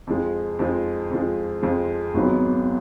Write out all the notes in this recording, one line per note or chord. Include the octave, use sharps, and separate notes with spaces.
F2 F3 G#3
F2 F3 G#3
F2 F3 G#3
F2 F3 G#3
G#1 G#2 F#3 B3